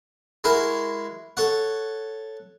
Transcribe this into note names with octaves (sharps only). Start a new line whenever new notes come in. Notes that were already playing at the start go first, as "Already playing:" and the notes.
G#3 E4 F#4 A#4
A4 C#5 F#5